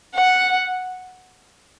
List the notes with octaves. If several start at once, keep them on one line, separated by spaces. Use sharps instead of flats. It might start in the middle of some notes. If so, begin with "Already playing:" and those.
F#5